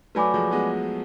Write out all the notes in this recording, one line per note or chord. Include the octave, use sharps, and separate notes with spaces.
F#3 A3 B4 D5 G#5 B5 D6
F3 G#3
G#3 B3